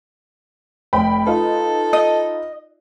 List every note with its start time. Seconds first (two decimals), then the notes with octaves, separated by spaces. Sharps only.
0.93 F1 G5 B5
1.26 D#4 F4 A4 B4
1.93 D#5